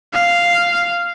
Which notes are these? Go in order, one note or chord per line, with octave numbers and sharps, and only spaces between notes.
F5